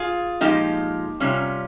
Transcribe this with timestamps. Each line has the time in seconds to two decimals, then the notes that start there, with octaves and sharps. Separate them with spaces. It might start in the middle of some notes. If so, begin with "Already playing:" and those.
Already playing: F4 G#4
0.41 A#2 F3 G#3 D#4 G4
1.20 C3 G3 C#4 F4